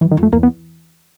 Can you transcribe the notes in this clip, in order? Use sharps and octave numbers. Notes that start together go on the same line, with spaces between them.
F#2 E3
D#3
F2
A3
E2 A#3
B3